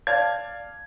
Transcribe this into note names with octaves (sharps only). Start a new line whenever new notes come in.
D5 F5 A5 G#6